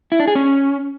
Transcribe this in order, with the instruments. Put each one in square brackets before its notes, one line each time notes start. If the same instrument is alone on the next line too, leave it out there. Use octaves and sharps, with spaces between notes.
[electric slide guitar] E4
D4
G#4
C#4